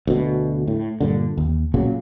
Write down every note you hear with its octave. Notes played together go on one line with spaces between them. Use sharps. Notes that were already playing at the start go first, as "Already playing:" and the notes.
D2 B2
A2
G2 A#2 D3
D#2
B1 A#2 C#3 F#3